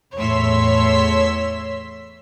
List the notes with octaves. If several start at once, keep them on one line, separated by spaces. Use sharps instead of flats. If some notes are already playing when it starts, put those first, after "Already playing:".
E2 A2 C#5 C6 E6 B6